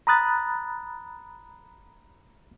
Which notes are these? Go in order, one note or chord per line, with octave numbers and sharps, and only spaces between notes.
A#5 B5 D#6 F#6 A6